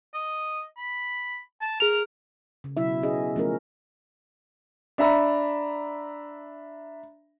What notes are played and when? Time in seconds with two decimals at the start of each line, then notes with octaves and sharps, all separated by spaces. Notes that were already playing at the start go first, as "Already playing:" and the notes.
0.14 D#5
0.77 B5
1.61 A5
1.80 G#4 A#4 F7
2.64 C#3
2.77 B2 F#3 E4 E5
3.03 B3 C#4 G#4 D#5
3.36 F3 A3 C#4 A#4
4.98 D4 E5 A#5 B5